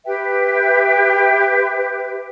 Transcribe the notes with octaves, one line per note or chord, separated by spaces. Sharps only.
G4 B4 E5 G5